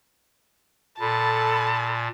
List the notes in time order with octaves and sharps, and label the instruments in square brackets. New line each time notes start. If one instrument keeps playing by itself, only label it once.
[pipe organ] A#2 [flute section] A4 B5 [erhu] A5